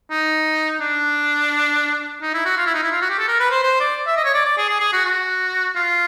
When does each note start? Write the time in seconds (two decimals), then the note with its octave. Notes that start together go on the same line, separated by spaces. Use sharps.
0.10 D#4
0.80 D4
2.21 D#4
2.34 E4
2.45 F#4
2.57 F4
2.66 E4
2.74 D#4
2.83 E4
2.92 F4
3.02 F#4
3.10 G4
3.19 A4
3.28 A#4
3.40 B4
3.51 C5
3.63 C5
3.80 D5
4.07 E5
4.16 D#5
4.25 C#5
4.34 D5
4.45 D5
4.57 G#4
4.69 G#4
4.80 G#4
4.93 F#4
5.05 F#4
5.75 F4